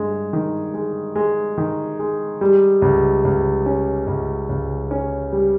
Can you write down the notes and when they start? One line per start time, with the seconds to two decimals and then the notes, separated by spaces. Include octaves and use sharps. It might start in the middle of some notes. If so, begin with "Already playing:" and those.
Already playing: G2 G#3
0.33 D#3
0.74 G#3
1.16 G#3
1.58 D#3
1.99 G#3
2.41 G3
2.82 C#2
3.25 C#2
3.66 C#4
4.07 C#2
4.49 C#2
4.91 C#4
5.32 G3